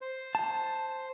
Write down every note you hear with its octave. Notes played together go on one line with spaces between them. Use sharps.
C5
A5